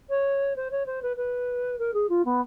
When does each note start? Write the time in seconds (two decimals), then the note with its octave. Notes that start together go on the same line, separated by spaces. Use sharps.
0.09 C#5
0.56 C5
0.71 C#5
0.86 C5
1.02 B4
1.17 B4
1.79 A#4
1.94 G#4
2.09 F4
2.25 B3